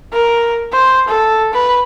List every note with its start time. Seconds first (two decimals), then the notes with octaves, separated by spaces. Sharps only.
0.13 A#4
0.72 C5
1.07 A4
1.53 B4